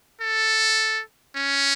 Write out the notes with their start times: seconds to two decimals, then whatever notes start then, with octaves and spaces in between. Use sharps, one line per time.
0.21 A4
1.37 C#4